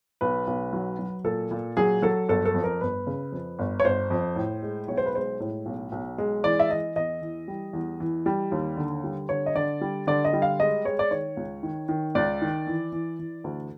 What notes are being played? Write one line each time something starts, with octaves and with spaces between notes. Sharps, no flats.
B1 B4
B1
F#3
F#3
A#2 A4
A#2
F#3 G#4
F#3 A4
G1 A4
A4
F2
A#4
G1 B4
C#3
F2
G1
C#5
G1 C5
F2
A2
G#3
B1 C#5
C5
B4
G#3 C5
A2
B1
B1
G#3
E3 D5
E5
E3 D#5
E2 D#5
E3
G3
E2
E3
G3
D#2
D3
G3
D3 C#5
D#5
D3 D5
G3
D3 D5
D#5
G3
F5
G#3 D#5
G#3 C#5
D5
D#3 C#5
C#2
D#3
D#3
C#2 D5
D#3
E3
E3
E3
D2